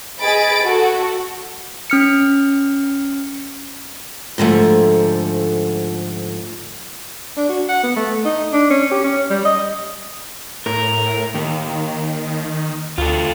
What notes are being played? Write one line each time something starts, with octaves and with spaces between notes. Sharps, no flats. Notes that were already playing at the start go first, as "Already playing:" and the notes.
G#4 D#5 B5 A6 D7
F#4 A4
C#4 F6 C#7
G#2 D3 F3 A3
D4
F#4
F#5
B3
A3
D#4
D4
C#4
G4
C#4
G3
D#5
A2 A#4
D#2 D#3
D2 F4 A4